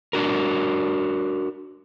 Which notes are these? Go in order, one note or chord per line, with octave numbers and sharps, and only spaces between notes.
D4 F#4 A#4